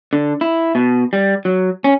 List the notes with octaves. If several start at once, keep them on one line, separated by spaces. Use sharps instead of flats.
D3
E4
B2
G3
F#3
C#4